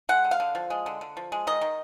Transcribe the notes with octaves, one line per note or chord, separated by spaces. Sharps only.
G#3 F#5
D3
F5
D3
F3
G#3
D3
D3
F3
G#3
D#3 D#5
D#3